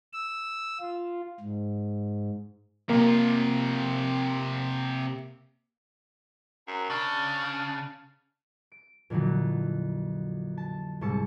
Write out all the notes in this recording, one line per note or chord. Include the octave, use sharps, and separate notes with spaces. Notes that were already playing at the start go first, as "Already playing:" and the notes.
E6
F4
G#2
C3 A#3 F4
F#2 A#5
C#3 D4 F6
D7
F2 A#2 D3 E3 F#3
A5
C2 G#2 G3 A5 C#6 E6